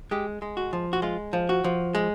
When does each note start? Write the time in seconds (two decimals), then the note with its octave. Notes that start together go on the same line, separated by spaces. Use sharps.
0.11 G#3 G4
0.42 G#3
0.57 F#4
0.73 F3
0.93 F#4
1.02 G#3 F4
1.33 F3
1.49 F#4
1.64 F3
1.95 G#3